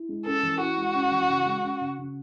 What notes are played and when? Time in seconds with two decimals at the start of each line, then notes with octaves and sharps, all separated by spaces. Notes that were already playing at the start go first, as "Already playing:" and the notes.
Already playing: E4
0.09 G#3
0.26 C#4 A4
0.43 E3
0.60 E4 F#4
0.78 G#3
0.94 C#4
1.11 E3
1.30 C#3
1.46 G#3
1.64 C#4
1.81 C#3
1.99 C#3